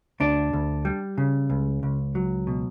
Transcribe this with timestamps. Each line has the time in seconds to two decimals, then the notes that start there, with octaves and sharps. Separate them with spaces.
0.20 D2 D4
0.53 D2
0.85 G3
1.18 C#3
1.50 C#2
1.83 C#2
2.15 F#3
2.47 B2